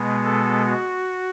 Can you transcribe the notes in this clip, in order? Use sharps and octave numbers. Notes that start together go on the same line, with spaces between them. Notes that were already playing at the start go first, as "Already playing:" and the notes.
Already playing: B2 G#3 B3
A4
F#4